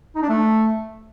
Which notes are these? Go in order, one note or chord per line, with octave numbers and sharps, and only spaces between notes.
D#4
D4
A3